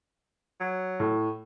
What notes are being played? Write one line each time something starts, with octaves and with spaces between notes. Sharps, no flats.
F#3
A2